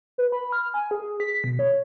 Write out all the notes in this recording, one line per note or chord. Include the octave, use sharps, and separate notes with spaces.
B4
B5
F6
G#5
G#4
B6
B2
C#5